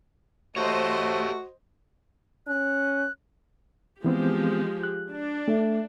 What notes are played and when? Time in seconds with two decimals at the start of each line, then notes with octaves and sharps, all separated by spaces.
0.56 A3 F#4 G4 C5 C#5 D#5
2.47 C#4 F#6
4.04 E3 F3 G#3 B3 C4 G4
4.83 F#6
5.12 D4
5.48 A3